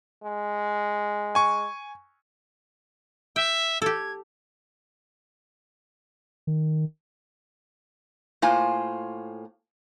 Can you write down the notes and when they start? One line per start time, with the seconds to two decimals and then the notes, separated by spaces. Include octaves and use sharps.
0.24 G#3
1.35 G#5 C#6
3.36 E5 G5
3.82 G4 A4 G#6
6.47 D#3
8.42 A2 A#3 F4 C5 G#5